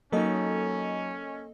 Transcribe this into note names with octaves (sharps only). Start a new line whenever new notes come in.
F#3 A#3 C#4 D#4 A4 D#5